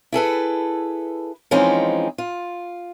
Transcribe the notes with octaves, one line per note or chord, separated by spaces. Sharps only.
E4 G#4 A4 B4
E3 F3 G#3 C4 C#4 D#4
F4